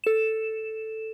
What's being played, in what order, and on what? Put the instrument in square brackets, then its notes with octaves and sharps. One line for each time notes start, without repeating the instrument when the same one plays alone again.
[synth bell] A4 E7